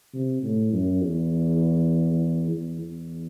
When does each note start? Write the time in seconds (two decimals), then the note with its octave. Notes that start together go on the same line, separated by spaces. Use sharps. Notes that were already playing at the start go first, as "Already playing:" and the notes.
0.14 C3
0.43 A2
0.73 F#2
1.02 E2
2.51 E2
2.81 E2